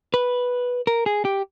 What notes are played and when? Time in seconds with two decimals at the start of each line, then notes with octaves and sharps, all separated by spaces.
0.14 B4
0.87 A#4
1.06 G#4
1.25 G4